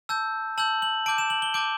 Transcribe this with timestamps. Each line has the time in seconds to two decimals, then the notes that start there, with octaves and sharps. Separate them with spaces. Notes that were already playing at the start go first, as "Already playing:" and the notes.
0.09 A5 E6 G6
0.58 A5 E6 G6 F#7
0.82 F#7
1.06 A5 D6 G6 D7
1.18 E7
1.30 F#7
1.42 G7
1.54 A5 D6 G6 D7